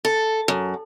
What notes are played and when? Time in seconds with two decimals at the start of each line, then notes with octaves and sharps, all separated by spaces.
0.05 A4
0.48 F#2